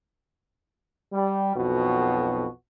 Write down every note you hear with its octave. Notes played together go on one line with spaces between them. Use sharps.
G3
B1 F2 B2 F#4